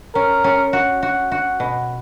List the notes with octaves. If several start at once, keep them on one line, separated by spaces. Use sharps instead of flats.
C#4 A#4
C#4
F#4
F#4
F#4
B2